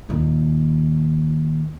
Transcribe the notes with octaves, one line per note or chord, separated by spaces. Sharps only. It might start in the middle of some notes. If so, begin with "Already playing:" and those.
D#2 A#2